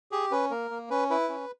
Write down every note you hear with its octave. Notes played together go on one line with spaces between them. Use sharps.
G4 G#4
C#4 B4
A#3 A#4
A#3
C#4 B4
E4 B4
C#4